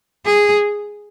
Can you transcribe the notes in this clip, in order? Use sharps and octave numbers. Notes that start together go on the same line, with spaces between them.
G#4